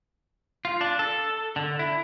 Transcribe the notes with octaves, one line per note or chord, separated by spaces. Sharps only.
F4
D4
A4
D3
E4